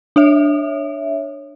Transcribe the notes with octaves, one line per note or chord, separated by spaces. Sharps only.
D4 C#5 E5